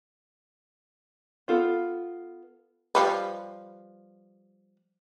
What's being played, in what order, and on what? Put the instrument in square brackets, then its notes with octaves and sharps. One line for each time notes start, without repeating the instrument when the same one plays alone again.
[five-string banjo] B3 F4 A4
[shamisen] F3 G3 B4